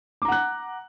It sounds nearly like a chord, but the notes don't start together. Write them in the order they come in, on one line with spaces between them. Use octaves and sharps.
D6 A#5 F#5 F#6